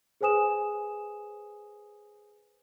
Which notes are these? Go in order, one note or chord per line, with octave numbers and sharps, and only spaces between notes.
G#4 B4 C5 G#5 D#6 E7